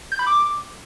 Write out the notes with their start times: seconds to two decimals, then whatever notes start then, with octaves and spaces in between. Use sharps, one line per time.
0.12 G6
0.19 B5
0.27 D6